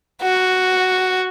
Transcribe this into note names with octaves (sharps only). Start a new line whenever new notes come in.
F#4